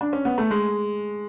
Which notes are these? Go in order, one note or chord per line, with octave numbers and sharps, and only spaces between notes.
D4
C#4
B3
A3
G#3